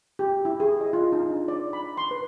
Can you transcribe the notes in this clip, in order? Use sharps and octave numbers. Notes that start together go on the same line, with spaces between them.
G4
E4
G#4
D#5
F4
D#4
D4
D5
B5
C6
B4